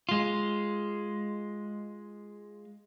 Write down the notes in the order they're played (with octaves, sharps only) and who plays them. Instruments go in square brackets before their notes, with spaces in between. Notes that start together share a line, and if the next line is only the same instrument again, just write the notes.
[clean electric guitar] G#3 F4